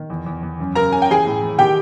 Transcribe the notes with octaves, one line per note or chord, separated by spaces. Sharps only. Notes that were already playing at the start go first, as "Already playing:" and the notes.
Already playing: D#3
E2
E2
E2
F#2
C#3 A#4 A#5
C#3 G#5
G5
E3 G#4 G#5
A2
E3
D#3 G4 G5